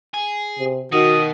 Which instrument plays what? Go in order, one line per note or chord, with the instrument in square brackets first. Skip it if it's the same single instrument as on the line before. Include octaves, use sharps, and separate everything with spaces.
[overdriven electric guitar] G#4
[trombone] C3
[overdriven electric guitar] B2 [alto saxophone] D#3 [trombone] F#4 [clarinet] D#6